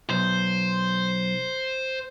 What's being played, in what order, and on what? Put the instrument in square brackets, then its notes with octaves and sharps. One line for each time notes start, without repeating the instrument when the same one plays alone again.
[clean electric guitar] B1 [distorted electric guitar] C5